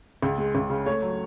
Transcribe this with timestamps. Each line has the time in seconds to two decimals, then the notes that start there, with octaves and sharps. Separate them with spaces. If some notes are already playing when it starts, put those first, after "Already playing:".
0.22 C#2
0.38 G#3
0.55 C#2
0.70 C#3
0.86 A3 C#5
1.02 F#3